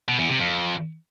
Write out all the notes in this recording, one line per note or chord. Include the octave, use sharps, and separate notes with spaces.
B2
E2
C3
F2